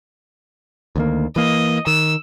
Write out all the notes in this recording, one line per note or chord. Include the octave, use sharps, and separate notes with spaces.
D2 D#3 A#3
E3 A#3 D#5
D#3 E6